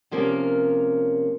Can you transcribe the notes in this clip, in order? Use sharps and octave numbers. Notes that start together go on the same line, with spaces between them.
C3 F3 A#3 C#4 A#4